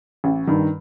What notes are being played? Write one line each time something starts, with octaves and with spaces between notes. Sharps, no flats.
A1
G2 D#3